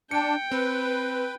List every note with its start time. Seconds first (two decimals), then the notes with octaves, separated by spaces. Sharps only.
0.11 D4 G5 C#7
0.52 C4 B4